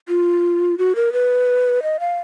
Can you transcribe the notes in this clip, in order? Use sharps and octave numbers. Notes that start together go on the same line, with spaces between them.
F4
F#4
A#4
B4
D#5
F5